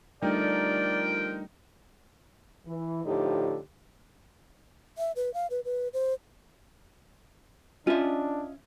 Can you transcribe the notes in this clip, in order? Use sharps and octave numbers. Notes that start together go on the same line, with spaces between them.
F3 G3 A3 D4 D#4 A#4 D5 G5
E3
A2 D3 F3 D#4 G4
E5
B4
F5
B4
B4
C5
C#4 D4 F4 D#5 E5